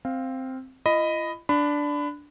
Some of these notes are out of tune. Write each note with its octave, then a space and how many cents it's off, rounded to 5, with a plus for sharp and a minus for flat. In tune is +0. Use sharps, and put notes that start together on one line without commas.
C4 +0 F5 +0
F4 -45 D#5 +0 B5 +10
D4 -5 B5 +25